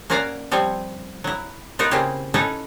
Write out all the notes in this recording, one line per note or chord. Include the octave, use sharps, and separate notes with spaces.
A#3 C#4 F#4 A#4 D5 F5
F3 G3 C4 C#5
F#3 E4
B3 D#4 F4 F#4 A#4 B4
C#3 A#3 C4 C#4 E4 G4
C#4 D#4 E4 A4 B4 C#5